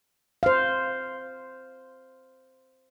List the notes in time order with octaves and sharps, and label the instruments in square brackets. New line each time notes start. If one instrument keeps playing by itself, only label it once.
[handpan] C5 F5